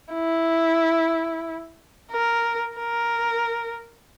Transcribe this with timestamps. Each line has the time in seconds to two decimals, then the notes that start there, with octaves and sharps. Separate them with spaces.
0.13 E4
2.11 A#4
2.77 A#4